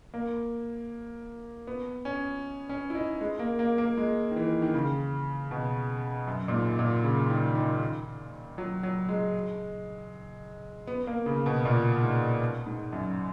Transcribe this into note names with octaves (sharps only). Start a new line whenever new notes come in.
A#3
B3
C#4
C#4
E4
D#4
G#3
A#3
A#3
A#3
G#3
D#3
E3
D#3
C#3
B2
F#2
A#2
G#2
A#2
C#3
D#3
D#3
F#3
F#3
G#3
B3
A#3
C#3
B2
A#2
G#2
G#2
F#2